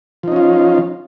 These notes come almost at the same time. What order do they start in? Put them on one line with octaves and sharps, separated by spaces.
F3 D#4 C#4 F4